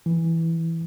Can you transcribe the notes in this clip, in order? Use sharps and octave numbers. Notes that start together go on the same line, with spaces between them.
E3